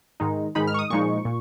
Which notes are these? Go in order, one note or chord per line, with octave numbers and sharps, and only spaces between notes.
G#2 D#3 G#3 D#4
G#2 D#3 G#3 D#4 B5
F6
C#6
D#6
A#2 F3 G#3 D#4 C#6
A#2